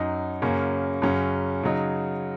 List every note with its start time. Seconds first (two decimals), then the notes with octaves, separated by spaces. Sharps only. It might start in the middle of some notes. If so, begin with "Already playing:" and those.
Already playing: F#2 F#3 D#4
0.42 F#2 C#3 A#3 C#4
1.02 F#2 C#3 F#3 C#4
1.63 C#3 F#3 D#4